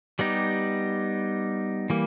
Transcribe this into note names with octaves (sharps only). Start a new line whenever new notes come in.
G3 B3 D#4 G4
E3 G3 A#3